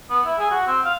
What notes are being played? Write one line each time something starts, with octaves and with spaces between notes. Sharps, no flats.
B3
E4
G#4
F#4
C4
F5